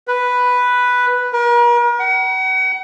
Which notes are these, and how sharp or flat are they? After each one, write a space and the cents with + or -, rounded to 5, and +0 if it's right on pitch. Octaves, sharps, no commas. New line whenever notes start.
B4 +0
A#4 +40
F#5 +35